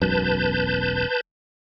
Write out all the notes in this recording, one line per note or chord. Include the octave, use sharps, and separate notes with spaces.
E1 B1 F#2 B4 A5 G6